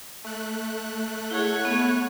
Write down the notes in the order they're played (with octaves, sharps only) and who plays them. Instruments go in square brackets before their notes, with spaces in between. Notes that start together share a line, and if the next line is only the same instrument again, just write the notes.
[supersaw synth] A3 F#6
[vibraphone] E4 G#4 [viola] C#5 F#5
[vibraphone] B3